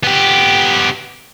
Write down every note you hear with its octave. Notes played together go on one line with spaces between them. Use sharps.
B3 G4